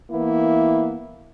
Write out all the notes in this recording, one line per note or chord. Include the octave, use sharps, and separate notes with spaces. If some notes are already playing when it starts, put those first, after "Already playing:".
E3 A#3 B3 E4